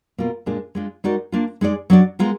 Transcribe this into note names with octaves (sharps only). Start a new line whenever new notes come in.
B2 A#3 F4 A#4
A#2 G#3 D4 F4 G#4
G#3 D4 F4
G#3 D#4 F#4 A#4 D5
A#3 D4 F4
G#3 D#4 G#4 D5
F#3 D4 F#4 D5
G#3 B3 F4 A#4